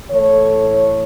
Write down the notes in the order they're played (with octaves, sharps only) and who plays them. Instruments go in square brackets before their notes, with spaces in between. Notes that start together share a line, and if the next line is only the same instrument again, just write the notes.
[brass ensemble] A2 E3 A3 A4 C#5